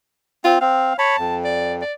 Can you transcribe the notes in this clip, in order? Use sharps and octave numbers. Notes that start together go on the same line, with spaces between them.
C4 F4
C4 F5
C#5 A5 B5
F2
D5
D5